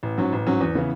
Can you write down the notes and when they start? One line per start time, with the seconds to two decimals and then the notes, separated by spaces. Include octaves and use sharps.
0.03 A1
0.18 G#2 F#3 C#4
0.32 A1
0.47 G#2 F#3 C#4
0.61 E2
0.75 C#3 E3 B3